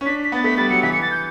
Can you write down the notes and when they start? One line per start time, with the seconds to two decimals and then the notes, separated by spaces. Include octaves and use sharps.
0.01 C#4
0.05 D4 B6
0.25 B6
0.32 B3 A6
0.44 A3 B6
0.57 G3 A6
0.70 F#3 C#7
0.83 E3 B6
0.93 C#7
1.02 A6
1.11 G6